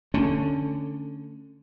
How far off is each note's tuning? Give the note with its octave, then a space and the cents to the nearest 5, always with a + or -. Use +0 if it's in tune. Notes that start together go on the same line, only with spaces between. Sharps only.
D3 +0 A3 +20 C#4 +0